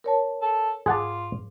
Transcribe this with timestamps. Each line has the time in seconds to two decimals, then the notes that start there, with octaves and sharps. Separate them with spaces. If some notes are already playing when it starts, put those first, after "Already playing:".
0.04 A#4 C#5 A5
0.42 A4
0.86 G#2 F4 G#4 F#5 A5 D6